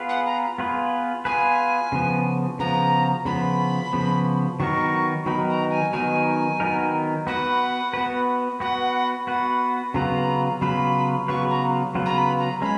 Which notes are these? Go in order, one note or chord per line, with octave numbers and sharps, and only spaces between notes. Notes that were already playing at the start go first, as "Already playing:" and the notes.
Already playing: B3 F4 G#4 B4
F#5
A#5
B3 F4 G#4 B4
B3 F4 G#4 B4 G#5
C#3 F3 B3
C#3 F3 B3 A#5
C#3 F3 B3 B5
C#3 F3 B3
D#3 F#3 B3 D#4 A#4 C#6
D#3 F#3 B3 D#4 A#4 B5
A#5
G#5
D#3 F#3 B3 D#4 A#4 G#5
D#3 F#3 B3 D#4 A#4
B3 F#4 B4 F#5
B3 F#4 B4
B3 F#4 B4 F#5
B3 F#4 B4 F#5
C#3 F#3 B3 F4 B4 A#5
C#3 F#3 B3 F4 B4 B5
C#3 F#3 B3 F4 B4 C#6
A#5
C#3 F#3 B3 F4 B4
A#5
B5
A#5
G#3 C#4 B5